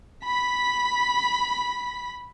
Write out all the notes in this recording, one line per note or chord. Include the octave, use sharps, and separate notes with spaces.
B5 B6